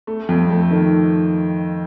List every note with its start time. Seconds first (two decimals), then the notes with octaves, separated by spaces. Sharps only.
0.07 A3
0.29 F2
0.50 A3
0.71 D#3